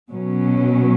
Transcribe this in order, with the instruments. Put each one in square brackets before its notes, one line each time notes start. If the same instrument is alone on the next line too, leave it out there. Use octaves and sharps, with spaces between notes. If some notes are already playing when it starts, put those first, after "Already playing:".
[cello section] B2 F#3 C#4